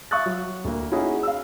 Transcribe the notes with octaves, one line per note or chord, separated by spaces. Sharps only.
E5 F5 C#6 D#6 F#6 A6
F#3
D2 A#3
C#4 D#4 E4 F#4 G#4
F5 E6